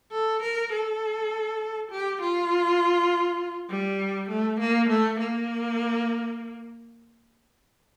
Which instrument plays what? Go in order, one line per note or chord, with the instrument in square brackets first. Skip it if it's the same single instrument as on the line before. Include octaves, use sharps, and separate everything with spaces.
[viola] A4
A#4
A4
G4
F4
G3
A3
A#3
A3
A#3